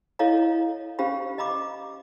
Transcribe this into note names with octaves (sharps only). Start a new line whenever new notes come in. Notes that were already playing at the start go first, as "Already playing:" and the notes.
E4 A4 C#5 D#5 F5 A#5
C#4 G4 C5 F5 B5
D#5 A#5 B5 D6